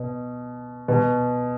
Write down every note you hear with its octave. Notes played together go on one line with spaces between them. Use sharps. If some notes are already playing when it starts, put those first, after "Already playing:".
Already playing: B2
B2